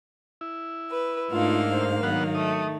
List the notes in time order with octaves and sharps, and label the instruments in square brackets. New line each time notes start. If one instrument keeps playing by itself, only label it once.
[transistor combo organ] E4
[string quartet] B4
[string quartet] G#2 A#3 F5 [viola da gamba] A3 D4 D#4 [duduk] F4
[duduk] C5
[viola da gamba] D#3 [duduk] F#3 [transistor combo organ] B3 F#4 F#5
[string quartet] A3 [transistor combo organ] D#6